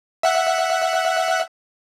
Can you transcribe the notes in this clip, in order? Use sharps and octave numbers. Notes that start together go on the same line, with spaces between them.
E5 F#5 F#6